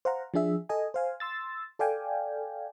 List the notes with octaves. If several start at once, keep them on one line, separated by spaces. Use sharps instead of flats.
C5 F5 F#5 A#5
F3 D4 G#4 E5
A4 D#5 G#5
C5 F5 G#5
C6 E6 A6
A4 D5 F5 G5 G#5